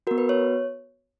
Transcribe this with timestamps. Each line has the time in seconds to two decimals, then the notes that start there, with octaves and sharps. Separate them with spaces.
0.07 F#4 A#4
0.11 B3
0.18 B4
0.29 C#5